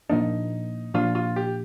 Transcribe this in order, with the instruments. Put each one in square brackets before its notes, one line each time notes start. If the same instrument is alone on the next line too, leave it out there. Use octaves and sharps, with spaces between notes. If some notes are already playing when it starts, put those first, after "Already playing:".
[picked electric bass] A#2 F3 A#3 D4 [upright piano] D#4
[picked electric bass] A#2 F3 A#3 D4 [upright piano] F4
[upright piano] F4
G4